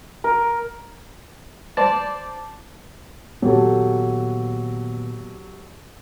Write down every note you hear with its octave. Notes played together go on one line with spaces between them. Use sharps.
A#4
C5 D5 A5
A#2 D#3 F#3 B3 G4 A4